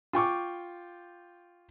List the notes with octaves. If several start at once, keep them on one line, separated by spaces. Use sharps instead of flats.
F4 G5 C#6 D6